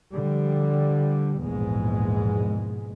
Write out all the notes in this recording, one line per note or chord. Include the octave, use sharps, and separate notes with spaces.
D3 F3 G3
A#1 E2 G#2 B2 G#3